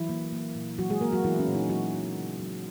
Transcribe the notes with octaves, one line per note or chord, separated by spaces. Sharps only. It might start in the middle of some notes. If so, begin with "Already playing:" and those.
Already playing: E3 F#3 E4
A#3
A#3
A#2
E3 F#3 F#4
G#3 G#4
A#3 A#4
F#3 F#4
E3 B3 E4
C#4
A#2
D#4
F#3 A#3 F#4
F#3
C#3
F#3